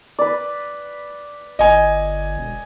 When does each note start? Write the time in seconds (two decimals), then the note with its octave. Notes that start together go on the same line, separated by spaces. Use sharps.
0.19 B4 D5
1.59 G1 D#5 G#5
2.38 E1